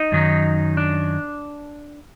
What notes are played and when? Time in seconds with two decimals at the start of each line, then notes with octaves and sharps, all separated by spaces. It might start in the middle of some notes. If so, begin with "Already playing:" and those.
Already playing: D#4
0.12 F#2 D#3 F#3
0.77 D4